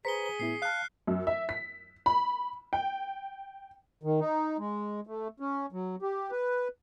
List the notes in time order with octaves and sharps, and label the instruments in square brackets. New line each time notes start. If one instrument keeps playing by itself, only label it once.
[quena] G#4 [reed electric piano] B4 C5 A#5 [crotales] B6 C#7 G7
[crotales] G7
[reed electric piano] A2 B3 E4 [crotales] C7
[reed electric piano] F5 A5 [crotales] F6 F#6 C7
[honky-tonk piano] F#2
E5
B6
B5
G5
[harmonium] D#3
D#4
G#3
A3
C#4
F#3
G4
B4